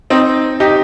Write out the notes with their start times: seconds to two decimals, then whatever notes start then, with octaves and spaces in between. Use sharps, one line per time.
0.10 C4 D#4
0.60 D#4 G4